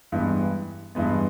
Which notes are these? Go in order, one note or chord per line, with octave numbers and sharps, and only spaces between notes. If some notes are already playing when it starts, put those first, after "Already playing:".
G2 E3 G#3 B3
G2 E3 G#3 B3